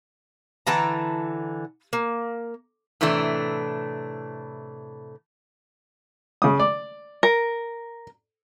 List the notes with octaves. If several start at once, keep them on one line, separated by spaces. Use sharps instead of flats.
D3 E3 A5 A#5
A#3
A2 C3 E3 A3 D4
C#3 D#6
D5
A#4